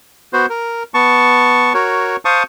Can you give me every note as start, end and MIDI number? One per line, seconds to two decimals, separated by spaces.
0.33 0.46 59
0.33 0.46 66
0.33 0.46 72
0.50 0.83 70
0.94 1.73 59
0.94 1.73 81
0.94 1.73 85
1.74 2.16 66
1.74 2.16 70
1.74 2.16 73
2.25 2.43 72
2.25 2.43 77
2.25 2.43 81
2.25 2.43 85
2.25 2.43 87